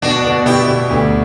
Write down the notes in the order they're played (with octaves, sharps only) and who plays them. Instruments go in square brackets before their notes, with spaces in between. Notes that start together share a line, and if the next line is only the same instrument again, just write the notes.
[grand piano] B2 [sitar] D4 F#4
[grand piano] B2
[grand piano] B2 [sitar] E4 G4
[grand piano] B2
D2